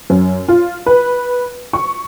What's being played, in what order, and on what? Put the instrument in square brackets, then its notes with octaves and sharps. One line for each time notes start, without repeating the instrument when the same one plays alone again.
[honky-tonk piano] F#2
F4
B4
C#6